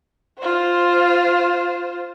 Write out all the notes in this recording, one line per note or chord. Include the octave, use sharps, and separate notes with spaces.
F4 C5